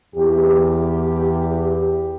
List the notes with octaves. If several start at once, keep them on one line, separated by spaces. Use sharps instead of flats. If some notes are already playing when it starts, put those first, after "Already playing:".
E2 G4